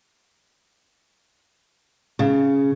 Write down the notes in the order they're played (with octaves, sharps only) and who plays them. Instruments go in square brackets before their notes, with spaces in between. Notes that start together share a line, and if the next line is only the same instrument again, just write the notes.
[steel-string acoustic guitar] C#3